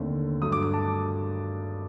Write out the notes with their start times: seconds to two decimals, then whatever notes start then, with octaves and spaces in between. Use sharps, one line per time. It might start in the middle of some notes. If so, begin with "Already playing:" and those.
Already playing: D#2 D3 A3 C4
0.42 G2 F#3 A3 D#6
0.52 D6
0.63 D6
0.74 A5